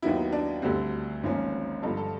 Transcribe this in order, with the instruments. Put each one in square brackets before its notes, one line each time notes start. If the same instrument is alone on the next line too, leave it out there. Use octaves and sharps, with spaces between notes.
[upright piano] D#2 D#3 F#3 B3 E4
D4
D2 D3 G3 C4 F#4
G#1 G#2 F3 A#3 C#4
G2 D3 F3 A4
A4